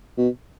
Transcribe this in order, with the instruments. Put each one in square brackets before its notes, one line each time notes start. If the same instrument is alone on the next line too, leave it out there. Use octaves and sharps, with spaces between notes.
[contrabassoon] B2